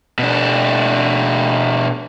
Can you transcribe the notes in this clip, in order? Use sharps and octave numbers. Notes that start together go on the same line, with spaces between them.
B2 D4